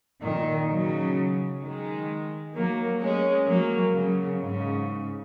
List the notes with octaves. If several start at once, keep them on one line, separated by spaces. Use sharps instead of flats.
A#2 D#3
C#3 F#3
D#3 G#3
F#3 A#3
G#3 C#4
F#3 A#3
C#3 F#3
G#2 C#3